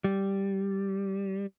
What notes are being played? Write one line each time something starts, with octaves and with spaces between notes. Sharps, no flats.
G3